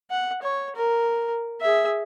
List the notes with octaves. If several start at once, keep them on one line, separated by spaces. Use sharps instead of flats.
F#5
C#5
A#4
G#4 E5